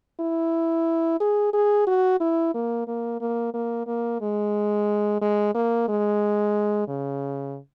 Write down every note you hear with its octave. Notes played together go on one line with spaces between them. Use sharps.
E4
G#4
G#4
F#4
E4
A#3
A#3
A#3
A#3
A#3
G#3
G#3
A#3
G#3
C#3